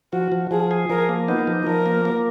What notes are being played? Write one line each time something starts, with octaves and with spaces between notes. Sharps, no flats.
F3 F#4
F3
F3 G#4
G#4
F3 A#4
A#3
B3 D#4
F3
F3 A#4
A#3
A#3